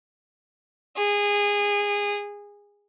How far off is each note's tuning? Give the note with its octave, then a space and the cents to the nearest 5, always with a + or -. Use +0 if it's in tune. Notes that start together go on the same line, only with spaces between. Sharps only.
G#4 -20